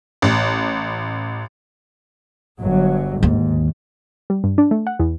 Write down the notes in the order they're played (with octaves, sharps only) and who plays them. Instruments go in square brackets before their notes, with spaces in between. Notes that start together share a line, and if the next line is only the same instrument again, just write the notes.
[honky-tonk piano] A1
[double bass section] G1 F#3
[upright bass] D#2 [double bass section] G#2
[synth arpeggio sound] G3
G2
D4
A3
F#5
E2